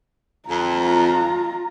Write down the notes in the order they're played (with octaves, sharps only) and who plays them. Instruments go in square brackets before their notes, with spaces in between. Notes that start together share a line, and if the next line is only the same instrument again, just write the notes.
[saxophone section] F2 [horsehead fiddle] F4 A#5